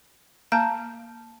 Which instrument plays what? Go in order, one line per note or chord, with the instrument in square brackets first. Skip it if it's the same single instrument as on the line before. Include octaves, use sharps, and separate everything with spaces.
[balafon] A#3 A#5 [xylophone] A5 G6